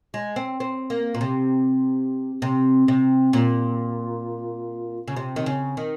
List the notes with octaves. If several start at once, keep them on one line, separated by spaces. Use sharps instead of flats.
G#3
C4
C4
A#3
A#2
C3
C3
C3
A#2
C#3
C3
D#3
C#3
D#3